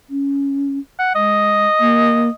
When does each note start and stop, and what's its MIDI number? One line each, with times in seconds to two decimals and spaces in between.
0.10 0.79 61
0.99 1.13 78
1.15 1.66 56
1.15 2.35 75
1.80 2.29 58